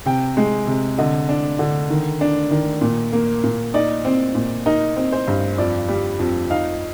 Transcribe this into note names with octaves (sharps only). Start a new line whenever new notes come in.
C3 G5
G#3
C3
D3 D#5
D4
D3
D#3
D4
D#3
A#2
A#3
A#2
D#4 D5
C4
A#2
D#4 A#4
C4
C5
G2
F2 D5
G3
F2
D#4 F5